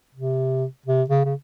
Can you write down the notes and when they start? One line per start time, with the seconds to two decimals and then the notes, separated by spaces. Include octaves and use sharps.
0.14 C3
0.86 C3
1.10 C#3
1.25 C#3